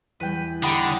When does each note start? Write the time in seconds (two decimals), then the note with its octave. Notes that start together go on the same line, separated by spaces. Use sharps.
0.20 E2 G3 B4 G5
0.63 D3 D#4 G4 F#5 B5 D#6